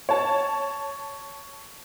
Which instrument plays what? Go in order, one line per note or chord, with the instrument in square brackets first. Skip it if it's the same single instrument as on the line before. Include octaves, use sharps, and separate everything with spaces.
[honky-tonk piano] C#5 A5